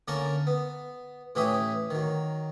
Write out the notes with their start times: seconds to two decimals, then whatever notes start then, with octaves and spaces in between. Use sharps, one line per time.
0.08 D3 A#3 C#4 A#4 A5 C#6
0.47 B3
1.35 A2 E3 C#4 G4 E5 D#6
1.91 D#3 F#3